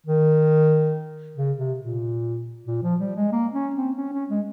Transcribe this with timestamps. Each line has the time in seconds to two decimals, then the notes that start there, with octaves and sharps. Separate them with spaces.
0.06 D#3
1.37 C#3
1.58 C3
1.80 A#2
2.67 A#2
2.83 F3
3.00 G3
3.16 G#3
3.32 A#3
3.54 C#4
3.76 C4
3.97 C#4
4.13 C#4
4.30 G#3